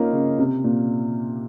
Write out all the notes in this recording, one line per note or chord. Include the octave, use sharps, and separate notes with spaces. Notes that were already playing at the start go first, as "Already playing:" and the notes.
Already playing: A#3 C4 C#4 D#4 F4
C#3
C3
A#2